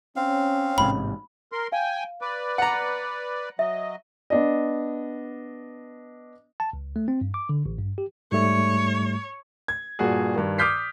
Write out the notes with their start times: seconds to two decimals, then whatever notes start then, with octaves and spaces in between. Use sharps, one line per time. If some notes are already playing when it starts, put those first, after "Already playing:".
0.16 C4 C#4 F5
0.78 A1 G#2 C3 B5
1.52 A#4 C6
1.72 F5 G5 G#5
2.21 B4 D5
2.58 F#5 A#5
3.59 F#3 D#5 E5
4.30 B3 D4 D#5
6.60 A5
6.73 C#2
6.96 A3
7.08 C4
7.21 G2
7.34 D6
7.49 D3
7.66 A1
7.78 G2
7.98 G4
8.32 G#2 G3 A3 C#5
9.68 G#6
9.99 G2 A#2 F#4 G#4
10.35 G2 D#3
10.58 D6 D#6 F6 G6 B6 C7